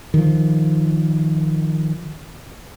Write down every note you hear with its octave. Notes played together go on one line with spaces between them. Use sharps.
D#3 F3